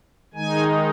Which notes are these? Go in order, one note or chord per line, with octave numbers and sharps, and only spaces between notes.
D#3 G#3 D#4 G#5